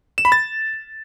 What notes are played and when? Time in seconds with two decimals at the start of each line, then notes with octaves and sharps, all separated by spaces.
0.18 E7
0.25 B5
0.32 A6